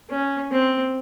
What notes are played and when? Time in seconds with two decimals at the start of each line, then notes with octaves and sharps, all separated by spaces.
0.10 C#4
0.51 C4